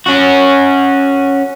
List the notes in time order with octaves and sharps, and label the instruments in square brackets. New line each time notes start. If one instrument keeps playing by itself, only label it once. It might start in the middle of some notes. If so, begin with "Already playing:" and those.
[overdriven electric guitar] C#4 F#4